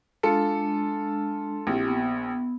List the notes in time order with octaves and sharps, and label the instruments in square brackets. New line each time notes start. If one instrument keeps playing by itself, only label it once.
[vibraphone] G#3 D4 [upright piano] F4 A4 C#7
[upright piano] A#1 [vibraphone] C4 E4 G4
[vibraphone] B3